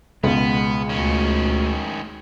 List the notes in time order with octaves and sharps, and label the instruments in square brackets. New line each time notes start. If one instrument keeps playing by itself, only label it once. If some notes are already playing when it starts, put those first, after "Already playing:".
[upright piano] C#2 B2 [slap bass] G#3 [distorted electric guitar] B3
[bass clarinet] D2 [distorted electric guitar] D#3 C#4